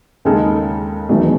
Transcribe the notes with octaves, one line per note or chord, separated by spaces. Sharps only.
D#2 C#3 G#3 D#4 A4
E1 E2 D#3 F#3 A3